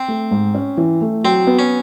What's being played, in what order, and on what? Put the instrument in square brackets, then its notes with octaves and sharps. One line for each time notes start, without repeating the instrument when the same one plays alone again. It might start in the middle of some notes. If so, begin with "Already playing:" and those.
Already playing: [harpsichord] C4
[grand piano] A3
G#2
C#4
E3
A3
[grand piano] F#3 [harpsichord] C4
[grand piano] B3
[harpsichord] C#4